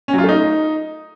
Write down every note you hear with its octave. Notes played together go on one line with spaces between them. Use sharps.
C#4
F#3
F4
A3
D#4